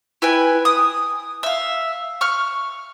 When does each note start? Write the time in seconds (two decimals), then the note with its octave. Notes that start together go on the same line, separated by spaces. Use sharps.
0.22 E4 B4 G5 G#5
0.65 D#6
1.43 E5 F5
2.21 C#6 F6